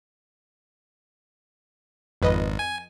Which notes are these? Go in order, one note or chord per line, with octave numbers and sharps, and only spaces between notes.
G#1 F2 B4 D#5
G#5